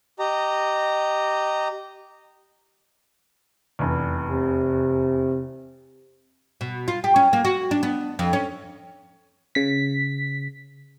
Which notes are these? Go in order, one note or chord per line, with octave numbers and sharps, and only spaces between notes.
G4 D#5 A#5
F1 E2
C3
B2
F4
G4
C#4
A#3
F#4
D4
B3
F2
C#4
C#3 B6